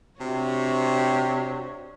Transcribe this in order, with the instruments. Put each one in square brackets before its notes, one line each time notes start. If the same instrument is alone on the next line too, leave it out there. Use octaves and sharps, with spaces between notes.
[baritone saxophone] C3 [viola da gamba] D4 F#4 C#5